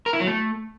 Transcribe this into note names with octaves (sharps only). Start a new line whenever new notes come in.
A#4
E4
F#3
A3